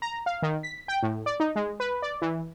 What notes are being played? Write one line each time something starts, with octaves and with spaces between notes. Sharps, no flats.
A#5
F5
D#3
B6
G5
A2
D5
D#4
G#3
B4
D5
E3